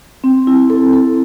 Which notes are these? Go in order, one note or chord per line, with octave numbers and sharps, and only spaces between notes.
C4
E4
A4
A4